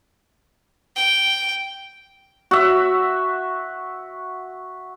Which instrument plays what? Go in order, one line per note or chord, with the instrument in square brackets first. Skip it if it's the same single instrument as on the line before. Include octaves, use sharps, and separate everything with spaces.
[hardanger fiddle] G5
[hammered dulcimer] F#4 E5